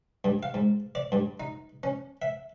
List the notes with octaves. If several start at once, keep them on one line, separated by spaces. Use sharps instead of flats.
G2
F5
G#2
D5
G2
D#4
C#4
E5